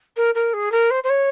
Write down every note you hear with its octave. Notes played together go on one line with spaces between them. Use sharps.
A#4
A#4
G#4
A#4
C5
C5
C#5